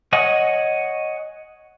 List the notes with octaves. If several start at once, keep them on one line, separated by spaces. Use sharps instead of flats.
C#5 D#5 F#5 G#5